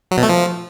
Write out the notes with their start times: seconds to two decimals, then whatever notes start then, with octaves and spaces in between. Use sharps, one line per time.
0.11 F#3
0.17 B2
0.23 A3
0.29 F3